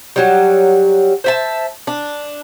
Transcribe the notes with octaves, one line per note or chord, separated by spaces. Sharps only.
F#3 G3
C5 E5 A5
D4